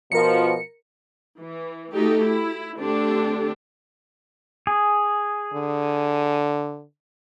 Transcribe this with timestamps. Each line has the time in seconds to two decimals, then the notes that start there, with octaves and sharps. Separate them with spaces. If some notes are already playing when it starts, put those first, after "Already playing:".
0.12 B2 F3 A#4 C#7
1.40 E3
1.93 A3 D#4 F#4 G4 A4
2.26 E4
2.79 D3 A3 C4 D4 G4 A4
4.67 G#4
5.54 D3